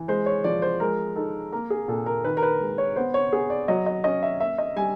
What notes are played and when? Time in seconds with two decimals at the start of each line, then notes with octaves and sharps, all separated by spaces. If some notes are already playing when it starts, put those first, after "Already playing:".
Already playing: E3
0.08 G#3 C5
0.26 C#5
0.44 F3 D5
0.62 C5
0.80 G#3 A#4
1.16 D#4 A4
1.52 A#3 A#4
1.70 G#4
1.88 A#2 A4
2.06 A#4
2.24 D#3 B4
2.37 A#4
2.43 B4
2.60 G#3
2.78 C#5
2.96 B3 C5
3.14 C#5
3.32 B3 G#4
3.50 D5
3.68 F#3 D#5
3.86 D#5
4.04 C#4 D#5
4.23 E5
4.40 A#3 E5
4.58 D#5
4.76 G3 G#5